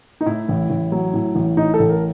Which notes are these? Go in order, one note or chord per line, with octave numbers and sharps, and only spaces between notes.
D#4
A2 E4
A1
A1
F#3
A2
A1
A2 D#4
A4
A1
A#4